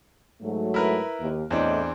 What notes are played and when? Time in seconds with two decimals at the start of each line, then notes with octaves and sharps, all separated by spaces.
0.42 G#2 F#3 A3
0.74 E4 A#4 B4
1.21 D#2
1.51 E2 A2 C4 D4 D#5